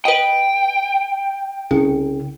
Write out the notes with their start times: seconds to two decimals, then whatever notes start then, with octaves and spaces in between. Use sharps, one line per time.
0.05 B4 D#5 G5
1.71 C2 C#3